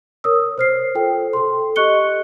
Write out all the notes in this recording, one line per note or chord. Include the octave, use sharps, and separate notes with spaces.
A#4 C#5 D#6 E6
C5 F6 C7
F4 A4 C5 G5
A4 C6
G4 D#5 C#6 F#6 C#7 G7